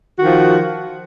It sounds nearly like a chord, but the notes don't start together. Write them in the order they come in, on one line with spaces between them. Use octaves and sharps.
F#4 D#3 F3